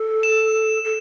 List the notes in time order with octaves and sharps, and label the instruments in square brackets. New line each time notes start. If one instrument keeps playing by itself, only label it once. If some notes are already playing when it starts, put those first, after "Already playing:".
Already playing: [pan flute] A4
[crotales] E7
[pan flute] A4